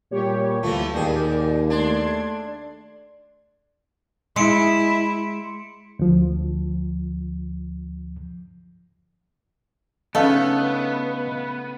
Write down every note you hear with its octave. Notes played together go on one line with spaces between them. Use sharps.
A#2 G3 G4 C#5
D2 A2 E3 F3 A3 F4
D#2 A#2 G4 G#4 D5
A3 D4 C6 G#6
G#3 E4 C6 C#7 D7
D2 F3
C#3 A3 B3 D4 D#4 D#5 F5